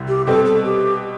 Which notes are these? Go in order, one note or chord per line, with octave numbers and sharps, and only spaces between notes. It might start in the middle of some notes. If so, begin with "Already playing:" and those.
Already playing: C2 C3 G3 E4
G4
B2 G3 C4 A4
A4
G4